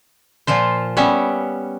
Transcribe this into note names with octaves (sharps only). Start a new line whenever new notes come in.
A#2 F3 F4 C5
G3 B3 C#4 E5